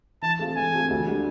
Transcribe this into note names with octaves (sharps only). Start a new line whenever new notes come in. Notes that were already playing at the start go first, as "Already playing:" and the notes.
E3 A5
A3 C4 F4 G#4
E3 G#5
A3 C4 F4 G#4
D2
D3 G3